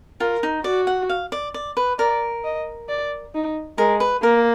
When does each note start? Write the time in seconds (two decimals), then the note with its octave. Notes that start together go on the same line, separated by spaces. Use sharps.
0.20 F4 A#4
0.43 D#4
0.64 F#4 D5
0.87 F#5
1.09 F5
1.32 D5
1.54 D5
1.77 B4
1.99 A#4 D5
2.44 D#5
2.89 D5
3.34 D#4
3.78 G#3 A#4
4.00 B4
4.23 A#3 A#4